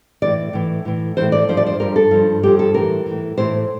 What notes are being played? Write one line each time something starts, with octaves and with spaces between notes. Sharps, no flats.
A2 E3 D5
A2 E3
A2 E3
A2 E3 C5
D5
G2 F3 C5
D5
C5
G2 F3 A#4
A4
G2 F3
G2 F3 G4
A4
A2 E3 A#4
A2 E3
A2 E3 C5